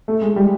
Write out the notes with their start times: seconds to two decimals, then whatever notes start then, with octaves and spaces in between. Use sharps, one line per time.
0.08 A3
0.22 G#3
0.36 G3